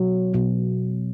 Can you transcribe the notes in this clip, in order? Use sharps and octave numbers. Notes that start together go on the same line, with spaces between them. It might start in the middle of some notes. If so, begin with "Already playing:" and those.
Already playing: B2 F#3
B2 F#3